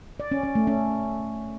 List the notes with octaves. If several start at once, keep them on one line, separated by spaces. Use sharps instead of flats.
D5
C#4
C#4
A3
C#4